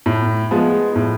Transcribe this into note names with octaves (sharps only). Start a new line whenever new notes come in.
A2
F3 G#3 B3
A2